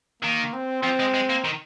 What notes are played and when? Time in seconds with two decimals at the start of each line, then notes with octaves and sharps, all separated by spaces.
0.22 D#3 A#3
0.53 C4
0.83 F3 C4
1.00 G#3
1.14 G#3
1.29 A#3
1.45 D#3